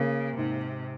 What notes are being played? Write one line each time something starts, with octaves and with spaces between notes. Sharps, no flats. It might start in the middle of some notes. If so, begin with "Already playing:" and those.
Already playing: C#3 A#3
G#2 C3